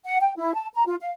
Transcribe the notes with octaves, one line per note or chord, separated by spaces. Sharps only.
F#5
G5
E4
A5
A#5
F4
F5